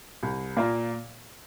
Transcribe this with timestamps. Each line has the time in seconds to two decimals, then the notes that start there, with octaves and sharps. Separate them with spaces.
0.23 C2
0.57 A#2 A#3 F4